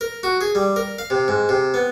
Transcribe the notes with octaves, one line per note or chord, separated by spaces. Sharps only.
A#4
F#4
G#4
G3
A#4
F5
C3
G#2
C3
B3